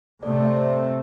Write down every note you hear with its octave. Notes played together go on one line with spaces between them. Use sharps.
C3 A3 C4 A4 D5
A4 D5
C5 E5
C5 E5